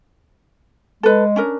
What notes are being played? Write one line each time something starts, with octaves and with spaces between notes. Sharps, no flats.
G#3 A4 B4
C#4 D4 A#4